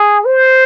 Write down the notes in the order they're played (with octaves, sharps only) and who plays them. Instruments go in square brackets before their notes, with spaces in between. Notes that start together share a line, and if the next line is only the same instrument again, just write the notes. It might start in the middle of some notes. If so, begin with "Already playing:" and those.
Already playing: [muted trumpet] G#4
C5